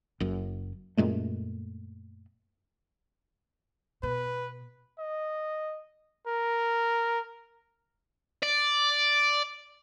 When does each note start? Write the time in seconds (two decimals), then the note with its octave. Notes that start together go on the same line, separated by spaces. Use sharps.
0.20 F#1 F#2
0.97 F#2 A#2 G#3 A3
4.03 B2 B4
4.99 D#5
6.27 A#4
8.42 D5